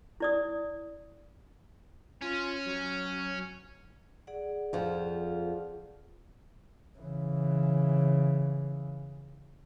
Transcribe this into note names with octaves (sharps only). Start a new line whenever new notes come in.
E4 D5 D#6
C#4 F4
F#3
G#4 D5 F#5
F2 F3
C#3 E3